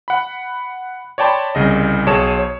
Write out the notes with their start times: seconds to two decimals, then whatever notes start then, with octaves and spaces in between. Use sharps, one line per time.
0.08 F#5 B5
1.18 C#5 D5 G5 A5 B5 C6
1.55 C2 C#3 D#5
2.06 B1 G#4 C#5 A5 D#6 E7
2.39 C#5